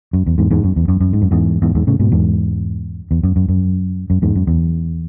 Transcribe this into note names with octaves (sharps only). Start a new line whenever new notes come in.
F#2
E2
E2 G#2
E2 G#2
F#2
E2
F#2
F#2
G#2
F#2
E2 G#2
E2 G#2
E2 G#2
A2 C#3
G#2 B2
E2 G#2
E2
F#2
F#2
F#2
F#2
E2 G#2
F#2
E2